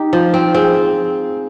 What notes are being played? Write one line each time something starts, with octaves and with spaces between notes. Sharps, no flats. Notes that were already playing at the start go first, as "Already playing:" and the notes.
Already playing: D#4 G4
F3 F4
C4
C4 G#4